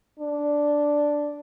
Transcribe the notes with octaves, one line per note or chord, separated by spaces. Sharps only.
D4